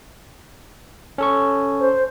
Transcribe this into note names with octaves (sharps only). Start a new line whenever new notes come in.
C#4 A4 C#6
C5